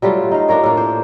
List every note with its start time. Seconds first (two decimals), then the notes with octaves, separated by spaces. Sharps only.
0.02 F#3 G3 A3 F4
0.31 D#4 F5
0.48 D4 F4 A#4 C#5
0.64 A2 A#3
0.77 C5